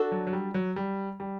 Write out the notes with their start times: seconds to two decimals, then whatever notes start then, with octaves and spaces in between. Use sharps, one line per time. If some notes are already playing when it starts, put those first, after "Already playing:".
Already playing: D4 F#4 A4
0.12 F#3
0.27 F#3
0.33 G3
0.54 F#3
0.76 G3
1.20 G3